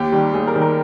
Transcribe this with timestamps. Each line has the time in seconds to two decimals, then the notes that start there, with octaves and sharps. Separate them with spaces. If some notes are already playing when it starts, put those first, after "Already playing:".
Already playing: D#2 G4
0.12 D#3 G3
0.33 D#2 G#4
0.47 A#4
0.54 D#3 G3
0.62 A#4